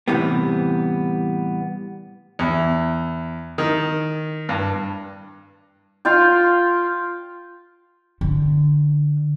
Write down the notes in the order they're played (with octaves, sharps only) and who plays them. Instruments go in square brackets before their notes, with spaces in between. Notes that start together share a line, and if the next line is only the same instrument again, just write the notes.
[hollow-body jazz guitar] A2 C3 E3 G3 B3
[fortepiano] E2
D#3
G2
[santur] F4 F5 G5
[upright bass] D3